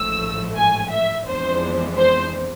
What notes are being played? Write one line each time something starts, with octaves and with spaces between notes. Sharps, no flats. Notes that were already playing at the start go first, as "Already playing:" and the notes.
Already playing: A1 G#2 F3 A3 E6
G#5
E5
F2 E3 G#3 B3 D4 C5
C5